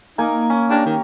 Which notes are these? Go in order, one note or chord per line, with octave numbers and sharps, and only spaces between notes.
A#3 D#4 A#4 G#5
C#4
D4 G4 A#4 C#5
D#3